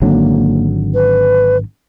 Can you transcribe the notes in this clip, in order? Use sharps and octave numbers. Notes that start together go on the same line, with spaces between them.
G#1 D3 F#3 A#3
B4